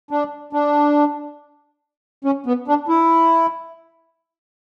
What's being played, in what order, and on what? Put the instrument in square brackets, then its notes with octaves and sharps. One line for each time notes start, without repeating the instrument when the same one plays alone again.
[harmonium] D4
D4
C#4
B3
D4
E4